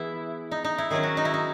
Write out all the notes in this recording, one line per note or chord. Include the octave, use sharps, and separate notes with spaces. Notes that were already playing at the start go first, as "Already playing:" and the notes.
Already playing: E3 B3 E4 G#4
D#4
D#4
E4
D#3 F#3 C#4 G#4
F#4
D#4
E4
D#4